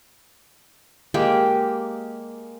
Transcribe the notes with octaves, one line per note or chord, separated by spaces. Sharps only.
G#3 A#3 G4